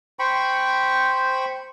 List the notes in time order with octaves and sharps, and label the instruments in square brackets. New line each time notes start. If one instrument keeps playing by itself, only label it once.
[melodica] C5 G5 B5 C#6